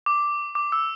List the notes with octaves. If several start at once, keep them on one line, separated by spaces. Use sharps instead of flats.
D6
D6
E6